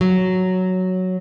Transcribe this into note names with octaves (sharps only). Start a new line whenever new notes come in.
F#3